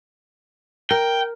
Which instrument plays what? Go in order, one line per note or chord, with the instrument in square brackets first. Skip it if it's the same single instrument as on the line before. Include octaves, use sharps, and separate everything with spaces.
[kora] A#4 [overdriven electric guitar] G5